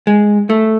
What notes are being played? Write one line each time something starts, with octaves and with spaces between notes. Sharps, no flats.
G#3
A3